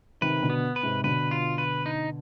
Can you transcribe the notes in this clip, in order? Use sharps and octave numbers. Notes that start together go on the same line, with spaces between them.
C3 D#3 B4
B2 D3
B3
B4
G#2 C3
B2 D3 B4
F4
B4
D#4